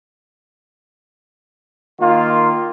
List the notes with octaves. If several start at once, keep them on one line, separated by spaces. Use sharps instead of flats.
D#3 A#3 F4